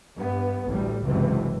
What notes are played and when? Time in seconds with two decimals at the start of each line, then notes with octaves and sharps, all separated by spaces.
0.15 G2 B3
0.71 A1 D2 A2 G3
1.04 F#1 C#2 G2 C3 E3